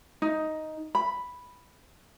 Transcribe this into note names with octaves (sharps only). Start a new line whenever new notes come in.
D#4
B5